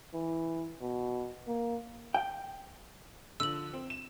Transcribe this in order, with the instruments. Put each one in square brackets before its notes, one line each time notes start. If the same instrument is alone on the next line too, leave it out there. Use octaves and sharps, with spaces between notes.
[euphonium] E3
B2
A#3
[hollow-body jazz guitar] G5
[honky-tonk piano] D3 F3 [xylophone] E6 F#7
[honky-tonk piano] C4
E7